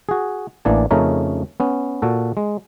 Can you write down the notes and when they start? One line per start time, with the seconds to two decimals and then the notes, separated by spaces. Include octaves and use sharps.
0.09 F#4 G#4
0.65 A1 E3 A#3 D4 D5 G#5
0.91 F2 C#3 A3 C#4 D#4 A#4
1.60 B3 C#4
2.02 A#2 F#4 A4
2.37 G#3